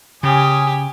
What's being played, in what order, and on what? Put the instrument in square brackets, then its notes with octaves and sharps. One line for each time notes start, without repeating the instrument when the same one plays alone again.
[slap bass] C#3 [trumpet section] C#4 D#6 [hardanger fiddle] G4 [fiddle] G#5